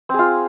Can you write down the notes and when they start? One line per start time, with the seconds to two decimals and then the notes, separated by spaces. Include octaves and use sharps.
0.09 C4
0.14 G#4
0.19 F4